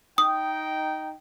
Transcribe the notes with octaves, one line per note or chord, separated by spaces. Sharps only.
D#4 G5 D#6